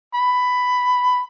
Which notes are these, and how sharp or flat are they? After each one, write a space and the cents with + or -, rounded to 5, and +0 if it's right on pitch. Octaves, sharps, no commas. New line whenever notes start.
B5 +10